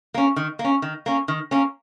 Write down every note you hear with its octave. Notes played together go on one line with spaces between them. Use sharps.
A#3 C#4
D#3
A#3
C#4
D#3
A#3 C#4
D#3
A#3 C#4